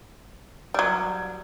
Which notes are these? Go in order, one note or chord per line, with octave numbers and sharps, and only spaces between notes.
F#3 G3